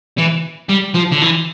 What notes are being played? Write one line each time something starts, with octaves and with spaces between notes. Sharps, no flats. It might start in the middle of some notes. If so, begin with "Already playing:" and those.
E3
G3
F3
D3
E3